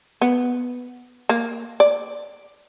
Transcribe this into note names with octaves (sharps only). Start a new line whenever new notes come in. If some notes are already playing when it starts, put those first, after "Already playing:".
B3
A#3
D5